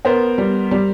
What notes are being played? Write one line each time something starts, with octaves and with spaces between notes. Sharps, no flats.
B3 A#4 C5
G3
G3